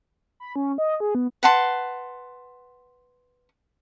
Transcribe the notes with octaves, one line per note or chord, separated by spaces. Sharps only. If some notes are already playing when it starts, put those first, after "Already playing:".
B5
C#4
D#5
G#4
B3
B4 F#5 A5 C6